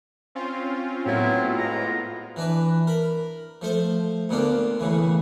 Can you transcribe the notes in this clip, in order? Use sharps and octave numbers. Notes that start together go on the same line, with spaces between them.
C4 C#4 F4
A2 F#3 B3 C4 E4 F4
G#2 A#5
E3 D4 B4
A#4 B5
F3 A3 C5
D2 A#2 B3 D4 F4
A2 C#3 E3